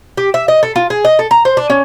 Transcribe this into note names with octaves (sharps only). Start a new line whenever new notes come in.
G4
E5
D#5
A4
F4
G#4
D#5
A4
A#5
C5
D4
C#4